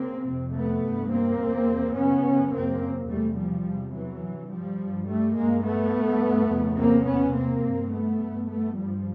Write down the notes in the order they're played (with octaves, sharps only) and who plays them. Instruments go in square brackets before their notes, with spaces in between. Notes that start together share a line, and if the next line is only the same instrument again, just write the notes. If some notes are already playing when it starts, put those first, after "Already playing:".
Already playing: [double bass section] C#3 A#3 C4
F2 C3
A3 B3
G2
A#3 C4
E2 C3
F#2 C#3 B3 C#4
F#2 C#3 A#3 C4
E2 C3 G3 A3
F3 G3
E2 C3
E3 F#3
G2
F3 G3
G2
G3 A3
G2 G#3 A#3
A3 B3
G2
F2 C#3
A#3 C4
E2 C3 B3 C#4
A#3 C4
G2
A3 B3
G2
A3 B3
G2 F3 G3